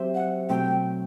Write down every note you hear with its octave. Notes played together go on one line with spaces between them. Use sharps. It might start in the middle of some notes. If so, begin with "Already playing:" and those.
Already playing: F#3 C4 G4 C5 E5
F#5
B2 F#3 A3 C4 G5